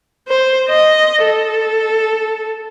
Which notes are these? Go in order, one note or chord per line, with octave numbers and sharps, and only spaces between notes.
C5
D#5
A4